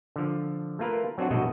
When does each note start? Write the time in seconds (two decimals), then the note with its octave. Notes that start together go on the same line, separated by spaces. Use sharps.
0.16 D3 F3
0.79 A3 A#3 F4 A#4 B4
1.18 F#3 C4 D4 F4 F#4
1.30 A#1 G2 B2 A3 F#4 D#5